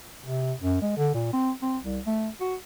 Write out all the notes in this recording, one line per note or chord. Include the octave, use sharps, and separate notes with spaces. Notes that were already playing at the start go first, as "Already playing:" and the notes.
C3
F#2
G#3
D3
A#2
C4
C4
C2
A3
F#4